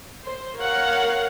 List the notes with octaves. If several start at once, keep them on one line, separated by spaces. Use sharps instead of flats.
C5
A#4 C#5 F5 F#5